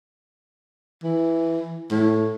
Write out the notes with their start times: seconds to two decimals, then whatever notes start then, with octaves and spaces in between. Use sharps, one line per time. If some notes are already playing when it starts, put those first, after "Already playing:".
1.03 E3
1.91 A2